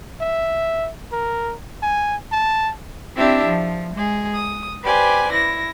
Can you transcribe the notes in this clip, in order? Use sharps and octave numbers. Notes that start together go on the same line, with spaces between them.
E5
A#4
G#5
A5
C4 D4 E4 G4 E5
F3
G#3 G#4
D#6
G4 B4 C5 D5 G#5
E4 A#6